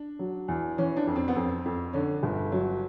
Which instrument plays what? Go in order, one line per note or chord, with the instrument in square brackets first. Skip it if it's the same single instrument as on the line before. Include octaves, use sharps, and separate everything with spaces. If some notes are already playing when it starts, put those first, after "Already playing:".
Already playing: [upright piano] D4
F#3
E2
E3 C#4
D4
F2
C4
B3
F2 C4
F2
D3 C#4
G1
F#3